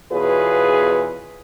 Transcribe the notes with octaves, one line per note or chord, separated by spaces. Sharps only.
E2 B2 F4 G#4 B4 C#5